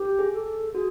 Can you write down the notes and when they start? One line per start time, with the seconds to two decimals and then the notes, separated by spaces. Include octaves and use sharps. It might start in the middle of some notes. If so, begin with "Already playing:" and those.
Already playing: G4
0.19 G#4
0.33 A4
0.75 F#4 G#4